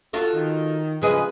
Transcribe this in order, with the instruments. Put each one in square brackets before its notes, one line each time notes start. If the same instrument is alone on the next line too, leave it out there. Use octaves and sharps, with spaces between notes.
[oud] F4 F#4 A4
[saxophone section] D#3
[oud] C#3 G#4 D#5 [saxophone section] F3 G#3 B4